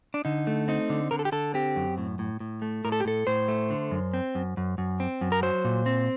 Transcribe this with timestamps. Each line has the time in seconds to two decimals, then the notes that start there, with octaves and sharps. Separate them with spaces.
0.14 D4
0.25 D3 D#4
0.47 A3
0.68 C4 D#4
0.90 D3
1.11 D3 A#4
1.19 A4
1.25 G4
1.32 D3 A4
1.54 C4 G4
1.76 F#2
1.98 A2
2.19 A2
2.40 A2
2.62 A3
2.85 A2 A#4
2.92 A4
3.00 G4
3.05 A2 A4
3.27 A2 C5
3.48 A3
3.71 D3
3.91 F#2
4.14 C4
4.35 F#2
4.57 F#2
4.78 F#2
5.00 C4
5.21 F#2
5.32 A#4
5.43 F#3 C5
5.64 A#2
5.86 C4